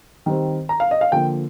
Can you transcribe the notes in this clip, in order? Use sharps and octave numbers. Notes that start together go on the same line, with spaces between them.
D#3 G3 C4
A#5
F5
D#5
F5
D3 F3 A#3 G5